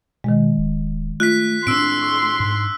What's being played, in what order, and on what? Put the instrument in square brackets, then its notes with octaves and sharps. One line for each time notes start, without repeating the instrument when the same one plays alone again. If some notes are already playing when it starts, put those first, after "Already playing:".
[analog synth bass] B2 [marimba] D#3 G#3
[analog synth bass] D1
[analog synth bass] A3 [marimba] F4 [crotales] F#6 B6
[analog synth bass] A2 [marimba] C4 D4 [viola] C6 [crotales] E6 D7
[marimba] C#6
[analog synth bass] G#2